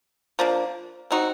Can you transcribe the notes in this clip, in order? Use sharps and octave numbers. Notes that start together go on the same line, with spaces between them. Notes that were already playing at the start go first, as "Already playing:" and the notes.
F3 A#3 D4
C4 D#4 F#4